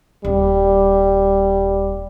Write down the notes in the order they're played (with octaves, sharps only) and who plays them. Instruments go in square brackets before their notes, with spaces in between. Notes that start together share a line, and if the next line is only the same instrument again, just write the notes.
[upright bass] D#1 [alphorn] G3